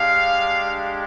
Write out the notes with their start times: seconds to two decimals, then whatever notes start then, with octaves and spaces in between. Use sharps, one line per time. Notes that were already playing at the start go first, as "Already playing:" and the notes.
Already playing: G#3 D4 G4 F5